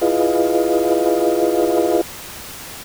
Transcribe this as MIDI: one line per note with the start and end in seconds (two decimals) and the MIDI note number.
0.01 2.01 64
0.01 2.01 65
0.01 2.01 68
0.01 2.01 71
0.01 2.01 75
0.01 2.01 77